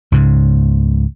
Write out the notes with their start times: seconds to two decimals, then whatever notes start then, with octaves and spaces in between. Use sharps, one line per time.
0.12 C#2 G#2 C#3